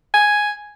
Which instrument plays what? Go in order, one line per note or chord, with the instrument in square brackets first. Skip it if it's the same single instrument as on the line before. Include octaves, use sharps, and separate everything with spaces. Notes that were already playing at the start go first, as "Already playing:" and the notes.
[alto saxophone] G#5